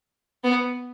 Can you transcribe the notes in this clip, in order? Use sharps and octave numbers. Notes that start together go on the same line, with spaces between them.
B3